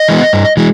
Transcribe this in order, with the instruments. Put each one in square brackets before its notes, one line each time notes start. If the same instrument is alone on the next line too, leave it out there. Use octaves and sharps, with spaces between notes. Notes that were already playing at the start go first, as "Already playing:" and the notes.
Already playing: [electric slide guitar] D#5
E3 G#3 B3
G2
E3 G#3